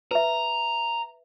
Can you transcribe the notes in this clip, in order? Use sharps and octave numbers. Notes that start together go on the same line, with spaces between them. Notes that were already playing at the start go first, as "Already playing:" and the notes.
B4 E5 A#5